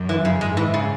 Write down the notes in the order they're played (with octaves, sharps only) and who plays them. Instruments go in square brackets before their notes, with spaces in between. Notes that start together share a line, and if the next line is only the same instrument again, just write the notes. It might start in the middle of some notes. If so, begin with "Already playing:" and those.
Already playing: [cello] F#2
[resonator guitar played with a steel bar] E3
C#3
[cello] G#2 [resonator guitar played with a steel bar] G#3
[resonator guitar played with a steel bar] E3
C#3